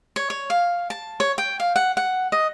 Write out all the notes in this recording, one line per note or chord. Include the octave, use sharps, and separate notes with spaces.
C#5
C#5
F5
A5
C#5
G5
F5
F#5
F#5
D#5